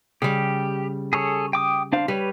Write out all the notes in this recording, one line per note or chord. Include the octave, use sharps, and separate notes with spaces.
C#3 G3 G4
G#4 A4 C#5
G5 D6 D#6
D4 C5 F5
G3 G4 B4 C#5